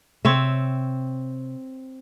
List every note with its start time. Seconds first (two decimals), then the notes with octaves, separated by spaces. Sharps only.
0.25 C3 C4 C#5 E5